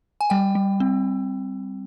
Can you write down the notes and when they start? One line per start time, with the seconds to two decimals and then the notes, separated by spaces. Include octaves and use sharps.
0.21 G#5
0.30 G3 G5
0.55 G3
0.80 C4